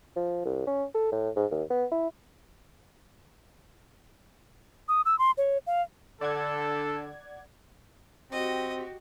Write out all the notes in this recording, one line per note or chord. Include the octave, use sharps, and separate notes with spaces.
F3
C2
C#4
A4
A2
G#2
D#2
B3
E4
D#6
E6
C6
C#5
F5
D3 A4 D5 F#5 G#6
C4 F#4 G4 D#5